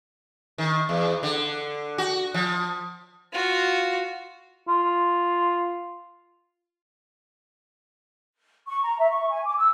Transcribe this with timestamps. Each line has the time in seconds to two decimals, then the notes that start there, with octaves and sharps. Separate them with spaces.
0.58 D#3
0.89 E2
1.23 D3
1.98 F#4
2.34 F3
3.33 F4 F#4
4.68 F4
8.66 C#6
8.83 A#5
8.99 E5
9.10 C#6
9.29 G#5
9.45 D6
9.57 E6